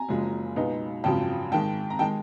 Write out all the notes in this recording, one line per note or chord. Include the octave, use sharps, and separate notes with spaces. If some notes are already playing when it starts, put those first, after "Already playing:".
Already playing: G#5 A#5
F#1 F#2 C#3 F3 G#3
C#2 B2 G#3 B3 D#4
G#1 F#2 C#3 F3 G5 A5
G#2 D#3 G#3 G5 A5
A#5
D#3 G#3 G5 A5